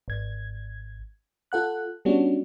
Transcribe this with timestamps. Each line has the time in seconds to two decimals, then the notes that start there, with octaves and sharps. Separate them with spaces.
0.08 G#1 G#6
1.52 F4 A4 F#5 F#6
2.05 G3 B3 C#4 D4 F#4